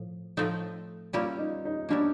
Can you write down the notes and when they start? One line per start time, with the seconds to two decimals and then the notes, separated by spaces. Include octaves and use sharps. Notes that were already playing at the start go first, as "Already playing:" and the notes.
Already playing: A2 F3
0.37 A2 F3 A3 C4 D#4
1.13 G3 A#3 C#4 E4 F4
1.39 D#4
1.65 D#4
1.89 G3 A#3 C#4 D4 E4